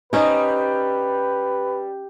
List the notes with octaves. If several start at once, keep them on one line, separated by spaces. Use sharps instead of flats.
G3 C#4 D#4 B4 C5 D#5